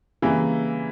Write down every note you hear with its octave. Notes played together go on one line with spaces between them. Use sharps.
C#3 E3 G3 A#3